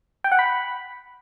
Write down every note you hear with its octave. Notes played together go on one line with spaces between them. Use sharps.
G5
F#5
B5